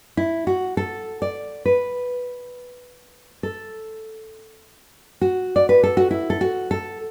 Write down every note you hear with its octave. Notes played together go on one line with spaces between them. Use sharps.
E4
F#4
A4
D5
B4
A4
F#4
D5
B4
A4
F#4
E4
A4
F#4
A4